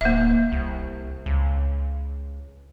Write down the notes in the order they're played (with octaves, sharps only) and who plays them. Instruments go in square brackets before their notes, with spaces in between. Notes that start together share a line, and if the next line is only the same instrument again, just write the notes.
[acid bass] D1 [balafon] A#3 E5
[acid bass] C2
C#2